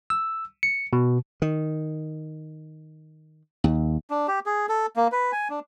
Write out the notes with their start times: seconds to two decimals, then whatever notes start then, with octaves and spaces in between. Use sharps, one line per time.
0.10 E6
0.63 C#7
0.93 B2
1.42 D#3
3.64 D#2
4.10 D4
4.28 G4
4.46 G#4
4.69 A4
4.96 A#3
5.12 B4
5.32 G#5
5.50 D4